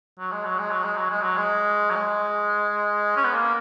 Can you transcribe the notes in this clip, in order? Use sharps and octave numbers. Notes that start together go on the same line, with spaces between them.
F#3
G#3
F#3
G#3
F#3
G#3
F#3
G#3
F#3
G#3
F#3
G#3
C#4
B3
A#3